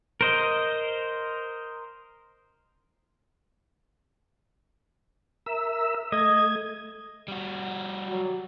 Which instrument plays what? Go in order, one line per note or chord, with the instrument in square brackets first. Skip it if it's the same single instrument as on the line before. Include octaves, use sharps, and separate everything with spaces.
[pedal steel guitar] A#4 C5 D#5
[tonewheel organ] A#4 E5 E6
[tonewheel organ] A3 G#6 [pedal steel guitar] D#5
[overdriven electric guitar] G3 F#4
[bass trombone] F#3